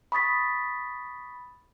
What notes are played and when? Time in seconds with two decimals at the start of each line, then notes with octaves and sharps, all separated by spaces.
0.12 B5 C#6 D#6 A6 B6